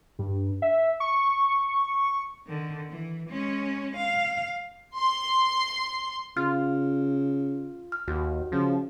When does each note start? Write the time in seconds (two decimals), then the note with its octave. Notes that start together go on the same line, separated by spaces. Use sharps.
0.19 G2
0.62 E5
1.00 C#6
2.47 D3 D#3
2.90 E3
3.30 G#3 C#4
3.97 F5
4.95 C6
6.37 C#3 F4 F6
7.92 F6
8.08 D#2 F#4
8.52 C#3 F3